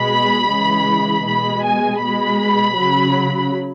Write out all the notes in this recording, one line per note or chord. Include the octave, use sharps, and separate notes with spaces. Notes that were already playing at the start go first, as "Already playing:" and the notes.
Already playing: B2 G#3 B5
C#3 E3 G#3
B2 G#3 B5
G#5
B2 G#3 B5
C#3 F#3